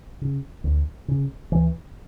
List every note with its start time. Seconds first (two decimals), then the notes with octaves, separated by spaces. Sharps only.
0.21 C#3
0.64 D2
1.08 C#3
1.52 D2 E3